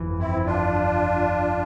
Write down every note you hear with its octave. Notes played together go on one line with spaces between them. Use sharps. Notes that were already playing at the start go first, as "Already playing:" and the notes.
Already playing: G1 F2 E3
C4 E4
D4 F4